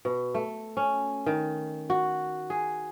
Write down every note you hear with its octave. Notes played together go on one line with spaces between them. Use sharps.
B2
A3
C#4
D#3
F#4
G#4